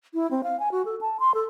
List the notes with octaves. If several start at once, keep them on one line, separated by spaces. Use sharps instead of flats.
E4
C4
F5
G#5
F#4
A4
A5
C6
A4